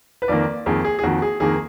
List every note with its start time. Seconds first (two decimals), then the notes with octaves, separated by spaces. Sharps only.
0.22 B4
0.28 F2 D#3 A#3 D5
0.66 F2 D#3 A#3 G#4
0.85 G#4
0.99 G#4
1.03 F2 D#3 A#3 F#4
1.22 G#4
1.40 F2 D#3 A#3 G#4